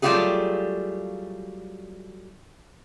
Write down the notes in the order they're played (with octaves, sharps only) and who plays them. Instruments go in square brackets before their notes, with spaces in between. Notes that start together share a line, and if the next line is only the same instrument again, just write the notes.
[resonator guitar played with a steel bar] F#3 G3 A3 F4 G4 G#4